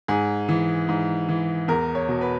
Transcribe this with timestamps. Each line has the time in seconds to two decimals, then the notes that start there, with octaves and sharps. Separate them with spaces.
0.08 G#2 G#4
0.49 E3
0.89 G#2
1.29 E3
1.68 E2 A#4
1.95 C#5
2.08 B2
2.21 B4